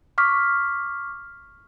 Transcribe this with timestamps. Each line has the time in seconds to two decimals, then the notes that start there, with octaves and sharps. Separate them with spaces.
0.18 C#6 D6 F6 B6